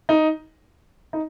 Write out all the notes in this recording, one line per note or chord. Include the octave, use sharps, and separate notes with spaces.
D#4
D#4